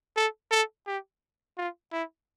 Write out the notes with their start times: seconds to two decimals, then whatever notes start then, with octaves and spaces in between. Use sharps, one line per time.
0.16 A4
0.51 A4
0.87 G4
1.57 F4
1.92 E4